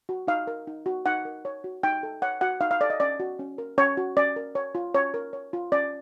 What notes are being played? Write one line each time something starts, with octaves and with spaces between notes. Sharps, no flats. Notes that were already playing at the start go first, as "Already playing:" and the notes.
F#4
D#4 F5
A#4
D#4
F#4
D#4 F#5
A#4
C#5
F#4
D#4 G5
A4
C#5 F#5
F#4 F#5
D#4 F5
F5
A4 D5
D#5
C#4 D5
F#4
C#4
A#4
C#4 C#5
F#4
C#4 D5
A#4
C#5
F4
C#4 C#5
A#4
C#5
F4
C#4 D5